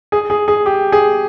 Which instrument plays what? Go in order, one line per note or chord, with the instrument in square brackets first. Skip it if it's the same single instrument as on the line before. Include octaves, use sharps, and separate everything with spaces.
[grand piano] G#4
G#4
G#4
G4
G#4